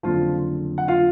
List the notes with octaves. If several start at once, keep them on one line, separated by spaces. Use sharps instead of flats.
F#1 F2 D3 F3 F4
F#5
F4 F5